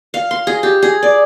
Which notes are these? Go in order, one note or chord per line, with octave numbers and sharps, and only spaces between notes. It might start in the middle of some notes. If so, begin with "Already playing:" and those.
F5
C6
G#4
G4
G#4
D5